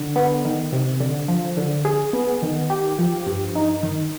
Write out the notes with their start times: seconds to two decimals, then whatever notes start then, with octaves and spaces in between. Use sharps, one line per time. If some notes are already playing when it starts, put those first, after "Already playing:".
Already playing: D3
0.16 B3
0.45 D#3
0.72 C3
1.00 D3
1.28 F3
1.57 D3
1.85 G#4
2.13 B3
2.42 D#3
2.70 G4
2.99 F3
3.26 G2
3.55 D#4
3.83 D#3